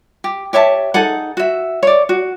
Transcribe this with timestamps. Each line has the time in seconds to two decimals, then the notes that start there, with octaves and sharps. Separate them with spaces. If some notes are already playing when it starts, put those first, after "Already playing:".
0.24 G4
0.53 G4 C#5 E5 A5
0.94 D#4 G#4 A4 F#5
1.37 F#4 E5
1.83 C#5 D5
2.09 F#4